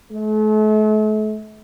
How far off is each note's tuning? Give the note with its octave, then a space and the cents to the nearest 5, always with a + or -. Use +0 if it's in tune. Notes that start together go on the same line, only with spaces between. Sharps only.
A3 -40